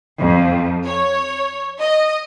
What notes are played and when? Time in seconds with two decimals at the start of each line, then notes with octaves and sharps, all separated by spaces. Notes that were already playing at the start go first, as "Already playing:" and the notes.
0.19 F2
0.85 C#5
1.79 D#5